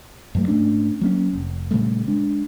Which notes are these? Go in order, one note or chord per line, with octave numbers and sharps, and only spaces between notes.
G2 F#3 A3
G#2 A3 C#4 D4
F#3 A#3 C#4
F1
A#2 C#3 G3 A3
G#3 D4